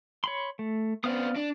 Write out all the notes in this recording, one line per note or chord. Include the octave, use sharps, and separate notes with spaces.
C#5 B5 C6
A3
B3 C4 D5 F5 D#6
D4